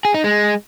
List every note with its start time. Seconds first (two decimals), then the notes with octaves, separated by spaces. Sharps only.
0.05 G#4
0.14 D#4
0.24 G#3